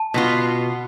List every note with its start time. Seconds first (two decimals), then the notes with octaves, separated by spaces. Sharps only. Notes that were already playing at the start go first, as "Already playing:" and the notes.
Already playing: A5
0.14 B2 B3 F4